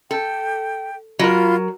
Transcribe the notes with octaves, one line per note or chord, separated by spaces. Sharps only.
A4 G5
F#3 F4 A#4 B5